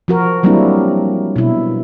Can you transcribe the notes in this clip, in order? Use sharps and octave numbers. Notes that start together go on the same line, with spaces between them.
F3 F#4 A#4
F#3 G3 A#3 C4 D4 E4
B2 E4